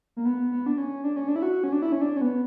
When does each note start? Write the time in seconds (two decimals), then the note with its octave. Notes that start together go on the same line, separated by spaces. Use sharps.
0.17 A#3
0.25 B3
0.52 B3
0.66 D4
0.78 C#4
1.04 D4
1.16 C#4
1.28 D4
1.36 E4
1.42 F#4
1.64 C#4
1.72 D4
1.82 E4
1.92 C#4
2.01 D4
2.17 C#4
2.21 B3